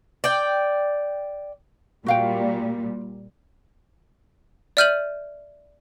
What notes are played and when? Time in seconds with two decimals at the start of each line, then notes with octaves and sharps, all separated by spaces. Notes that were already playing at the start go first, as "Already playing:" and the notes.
0.24 D5 G5
2.06 A#2 G3 F#4 F5 G5
4.77 D5 E5 F6 G6 D#7 F#7